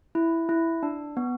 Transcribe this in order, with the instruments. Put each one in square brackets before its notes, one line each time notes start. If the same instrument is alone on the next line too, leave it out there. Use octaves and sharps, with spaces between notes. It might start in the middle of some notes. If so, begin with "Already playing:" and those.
[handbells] E4
E4
D4
B3